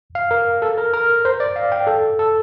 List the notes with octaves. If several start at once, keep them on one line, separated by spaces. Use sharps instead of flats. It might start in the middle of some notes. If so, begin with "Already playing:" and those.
F5
A#4
A4
A#4
A#4
C5
D5
F5
G5
A4
A4